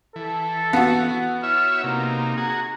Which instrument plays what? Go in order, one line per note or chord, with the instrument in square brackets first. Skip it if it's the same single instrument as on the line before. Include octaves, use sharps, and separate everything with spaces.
[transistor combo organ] E3 [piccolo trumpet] A4
[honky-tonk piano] B3 F#4
[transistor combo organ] E4 C#5 E5 [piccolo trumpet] F6
[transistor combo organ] C3 A#3 [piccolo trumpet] D#4
[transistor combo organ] F#4 G#4 [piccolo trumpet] A#5